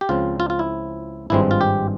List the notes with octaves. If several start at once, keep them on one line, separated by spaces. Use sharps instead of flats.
G4
C#2 C#3 F3 C4 F4
F4
F4
E4
G#1 G2 F3 G#3 C4 E4
F4
G4